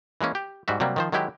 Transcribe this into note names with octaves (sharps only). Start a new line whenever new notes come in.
E3 G#3 A#3 C#4
G4
G#2 G3 F#4 E5
C3 F#3 G3 A#3
D#3 F3 C5
D#3 F#3 G#3 E4 G4